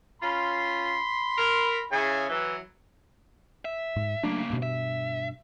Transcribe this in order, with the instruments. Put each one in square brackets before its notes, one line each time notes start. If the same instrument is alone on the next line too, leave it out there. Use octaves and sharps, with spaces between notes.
[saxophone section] C#4 F4 [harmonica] B5 C6
[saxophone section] A#4
[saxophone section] C#3 [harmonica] E4 G#4 G#5
[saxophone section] E3 [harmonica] F#3
[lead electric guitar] E5
[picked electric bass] G#2
[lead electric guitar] C#3 A#3 [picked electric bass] F#3 A3 D4
[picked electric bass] G2 B2
[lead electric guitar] E5